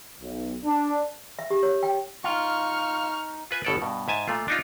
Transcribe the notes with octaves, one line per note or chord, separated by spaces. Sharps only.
B1
D4
E5
G4
C#5
G5
D#4 F4 C#6 F6
F4 B4 G#5
G1 B2 A4 C#5 D5
G2 B2
G#2 E5 G#5 A5
A#2 A3 F4
D4 D#4 F4